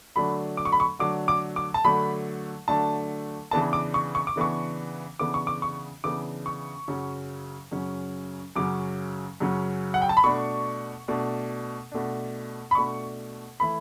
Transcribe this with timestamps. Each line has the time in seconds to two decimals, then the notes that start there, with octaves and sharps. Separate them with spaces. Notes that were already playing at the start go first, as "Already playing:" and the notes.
0.16 D3 F#3 A3 D4 B5
0.57 D6
0.65 C#6
0.72 B5
0.80 C#6
0.99 D3 F#3 A3 D4 D6
1.28 D6
1.56 D6
1.74 A5
1.84 D3 F#3 A3 D4 B5
2.68 D3 F#3 A3 D4 A5
3.51 C#3 E3 B3 D4 A5
3.73 D6
3.94 C#6
4.15 C#6
4.27 D6
4.36 C#3 E3 B3 D4 C#6
5.19 C#3 E3 B3 D4 D6
5.34 C#6
5.47 D6
5.62 C#6
6.04 C#3 E3 B3 D4 D6
6.46 C#6
6.88 F#2 C#3 F#3 C#4
7.72 F#2 C#3 F#3 C#4
8.56 F#2 C#3 F#3 C#4 D6
9.40 F#2 C#3 F#3 C#4
9.94 F#5
10.02 G5
10.09 A5
10.17 B5
10.24 B2 A3 D4 C#6
11.08 B2 A3 D4
11.92 B2 A3 D4
12.71 B5
12.75 B2 A3 D4 C#6
13.60 E3 A3 E4 B5